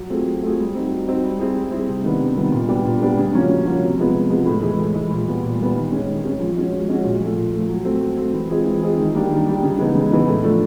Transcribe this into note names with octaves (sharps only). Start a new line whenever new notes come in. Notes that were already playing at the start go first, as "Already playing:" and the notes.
Already playing: F#3
A3 C4 F4 G#4
F#3
A3 C4 F4 G#4
G3
C4 D#4 F#4
G3
C4 D#4 F#4
G3
C4 E4 G#4
G3
C4 E4 G#4
C3
D#3 G3 B3 D4
C3
D#3 G3 B3 D4
A#2
G3 B3 D4 G4
A#2
G3 B3 D4 G4
C#3
F3 A#3 C#4 F#4
C#3
F3 A#3 C#4 F#4
C3
F3 G#3 B3
C3
F3 G#3 B3
A2
E3 G#3
A2
E3 G#3
A#2
G3 B3
A#2
G3 B3
D#3
G#3 C#4
D#3
G#3 C#4
F3
G#3 C#4 F#4
F3
G#3 C#4 F#4
A#2
F3 A3
A#2
F3 A3
F#3
A3 C4
F#3
A3 C4
E3
G#3 C4 F4 G#4
E3
G#3 C4 F4 G#4
D#3
G3 A#3 D4 G4
D#3
G3 A#3 D4 G4
C#3
E3 G#3 B3 D#4
C#3
E3 G#3 B3 D#4
A2
F3 A3 D4